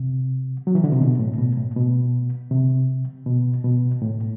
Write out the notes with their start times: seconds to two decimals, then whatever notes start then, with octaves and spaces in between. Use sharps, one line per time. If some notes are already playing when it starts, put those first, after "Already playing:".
Already playing: C3
0.67 F#3
0.75 E3
0.84 D3
0.92 C3
1.01 B2
1.19 A2
1.38 B2
1.57 A2
1.76 B2
2.51 C3
3.26 B2
3.64 B2
4.02 A2